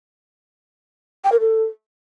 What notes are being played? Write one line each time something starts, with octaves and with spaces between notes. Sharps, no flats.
G5
A#4
A4